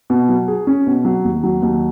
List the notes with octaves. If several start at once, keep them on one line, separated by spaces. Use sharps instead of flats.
B2
F#3
G#4
C#4
B2
F#3
D#2
F#3
D#2